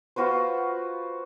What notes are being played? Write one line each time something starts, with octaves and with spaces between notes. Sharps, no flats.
F4 F#4 B4 C5